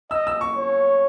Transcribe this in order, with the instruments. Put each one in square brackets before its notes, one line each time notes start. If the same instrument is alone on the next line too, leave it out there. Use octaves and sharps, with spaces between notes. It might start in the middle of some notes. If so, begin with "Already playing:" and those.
[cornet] D#5 [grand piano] E6
[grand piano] E6
C#6
[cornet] C#5